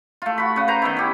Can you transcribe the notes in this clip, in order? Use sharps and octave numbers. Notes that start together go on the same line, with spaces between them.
A3 F4
F#4 B5
C#3 F#5
B4 C5 A#5
D#3 B3 E4
C#4 G4